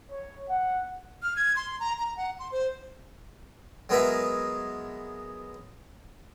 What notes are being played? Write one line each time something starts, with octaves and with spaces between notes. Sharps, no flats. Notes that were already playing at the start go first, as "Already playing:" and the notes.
C#5
F#5
F6
G#6
C6
A#5
A#5
F#5
C6
C5
F#3 G#3 B3 A#4 B4 E5